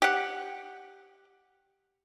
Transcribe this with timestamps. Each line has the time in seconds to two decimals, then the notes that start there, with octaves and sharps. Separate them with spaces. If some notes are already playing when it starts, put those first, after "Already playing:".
0.02 G4 F#5